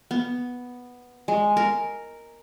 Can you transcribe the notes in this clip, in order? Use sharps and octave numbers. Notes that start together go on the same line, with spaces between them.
B3
G#3
A#4